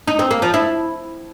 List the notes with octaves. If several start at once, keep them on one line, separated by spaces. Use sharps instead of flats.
D#4
C4
A#3
F3
E4